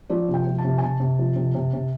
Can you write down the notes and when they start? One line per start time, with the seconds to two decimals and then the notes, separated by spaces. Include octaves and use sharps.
0.10 F3 D5
0.28 C3
0.34 G5
0.47 F3
0.58 A5
0.64 C3
0.78 G#5
0.82 C3 A5
1.00 C3
1.19 F3
1.36 C3
1.55 C3
1.73 C3